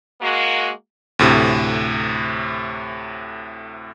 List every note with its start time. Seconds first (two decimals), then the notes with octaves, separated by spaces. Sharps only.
0.21 G#3 A#3 F#4
1.19 D2 A2 C3